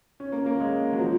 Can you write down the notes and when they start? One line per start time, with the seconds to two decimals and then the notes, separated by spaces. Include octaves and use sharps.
0.20 C#4
0.32 A#3
0.46 A#3
0.60 G#3
0.93 F#3
0.99 F3